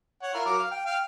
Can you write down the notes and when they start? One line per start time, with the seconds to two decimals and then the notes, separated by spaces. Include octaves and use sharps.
0.22 C#5 F#5
0.34 E4 F4 A#4
0.46 F#3 A#4 D6
0.59 F5
0.71 G5
0.86 F5 G5